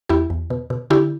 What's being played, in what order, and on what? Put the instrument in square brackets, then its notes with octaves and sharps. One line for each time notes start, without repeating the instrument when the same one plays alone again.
[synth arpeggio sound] E2 E4 G4
E2
B2
B2
D3 E4 G4